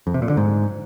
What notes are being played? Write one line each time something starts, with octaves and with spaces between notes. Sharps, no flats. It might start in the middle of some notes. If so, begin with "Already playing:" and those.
F2
C3
A#2
D3
G#2